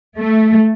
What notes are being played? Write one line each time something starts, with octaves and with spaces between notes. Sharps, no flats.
A3